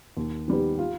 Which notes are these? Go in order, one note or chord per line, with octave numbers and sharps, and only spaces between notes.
D#2
D#3 G3 B3
F4